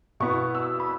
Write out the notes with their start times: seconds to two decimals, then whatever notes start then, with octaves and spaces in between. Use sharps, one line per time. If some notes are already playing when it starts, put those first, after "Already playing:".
0.20 B2 B3 E4 C#6
0.55 E6
0.80 B5